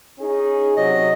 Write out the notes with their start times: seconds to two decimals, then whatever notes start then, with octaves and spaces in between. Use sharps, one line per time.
0.19 C#4 D#4 G#4
0.77 C3 F#3 D#5